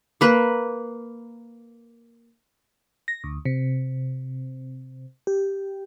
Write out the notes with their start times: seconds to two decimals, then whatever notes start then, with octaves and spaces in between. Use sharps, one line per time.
0.21 A#3 B4
3.08 A#6
3.24 D2
3.45 C3
5.27 G4